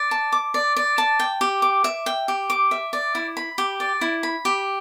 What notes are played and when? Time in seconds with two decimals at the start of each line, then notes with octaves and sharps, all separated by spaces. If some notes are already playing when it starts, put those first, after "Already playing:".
Already playing: D5
0.11 A5
0.32 D6
0.54 D5
0.77 D5
0.98 A5
1.20 G5
1.41 G4
1.62 D6
1.84 E5
2.06 G5
2.28 G4
2.50 D6
2.71 E5
2.93 D5
3.15 E4
3.37 B5
3.58 G4
3.80 D5
4.01 E4
4.23 B5
4.45 G4